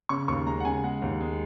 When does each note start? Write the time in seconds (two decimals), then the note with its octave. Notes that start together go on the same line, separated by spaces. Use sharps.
0.09 C#3 C#6
0.28 D#2 C#6
0.46 G#3 A#5
0.60 F#5
0.65 C#3 G#5
0.84 G#3 F#5
1.02 D#2
1.21 G#3